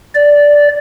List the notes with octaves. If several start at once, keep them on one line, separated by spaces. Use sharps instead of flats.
D5